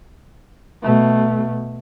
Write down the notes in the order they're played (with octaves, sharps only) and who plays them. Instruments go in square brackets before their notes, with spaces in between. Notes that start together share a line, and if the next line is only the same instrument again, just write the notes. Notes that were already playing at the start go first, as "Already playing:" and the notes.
[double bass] B2 A3